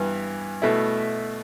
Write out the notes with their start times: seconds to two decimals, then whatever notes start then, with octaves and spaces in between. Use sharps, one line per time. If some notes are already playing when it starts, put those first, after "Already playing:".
Already playing: G2 E3 B3
0.62 B2 A3 E4